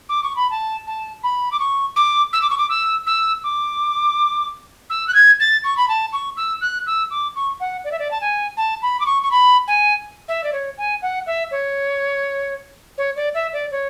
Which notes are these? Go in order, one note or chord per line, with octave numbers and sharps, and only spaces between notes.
D6
C#6
B5
A5
A5
B5
D6
C#6
D6
E6
D6
C#6
D6
E6
E6
D6
E6
F#6
G#6
A6
C#6
B5
A5
C#6
E6
F#6
E6
D6
C#6
F#5
D5
E5
D5
A5
G#5
A5
B5
D6
C#6
C#6
B5
G#5
E5
D5
C#5
G#5
F#5
E5
C#5
C#5
D5
E5
D5
C#5